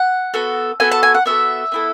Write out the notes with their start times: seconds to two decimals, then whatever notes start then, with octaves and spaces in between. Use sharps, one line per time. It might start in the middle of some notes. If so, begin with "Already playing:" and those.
Already playing: F#5
0.34 B3 F#4 A4
0.80 B3 F#4 A4 G#5
0.92 A5
1.03 G#5
1.14 F#5
1.26 B3 F#4 A4 E5
1.72 B3 E4 A4